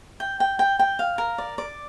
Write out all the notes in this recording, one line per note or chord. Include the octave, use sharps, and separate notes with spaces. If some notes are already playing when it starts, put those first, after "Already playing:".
G5
G5
G5
G5
F5
A#4
D5
D5